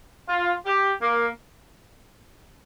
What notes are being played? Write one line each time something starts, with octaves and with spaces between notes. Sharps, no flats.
F4
G4
A#3